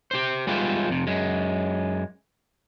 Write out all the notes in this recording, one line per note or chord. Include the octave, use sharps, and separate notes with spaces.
G4 C5
G3 G#3 B3 E4 F4 G4
F2 C3
F#2 G#3